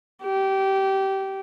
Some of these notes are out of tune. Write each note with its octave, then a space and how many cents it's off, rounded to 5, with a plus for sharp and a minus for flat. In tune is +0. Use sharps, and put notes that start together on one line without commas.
G4 -20